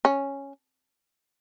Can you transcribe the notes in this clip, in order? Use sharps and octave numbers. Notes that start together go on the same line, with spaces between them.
C#4